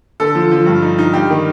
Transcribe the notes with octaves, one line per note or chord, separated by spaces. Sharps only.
D3 A4
F3
F3
G2
D#4
D#4
G2 G4
D#3